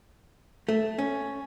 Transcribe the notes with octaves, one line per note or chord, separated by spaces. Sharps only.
A3
C#4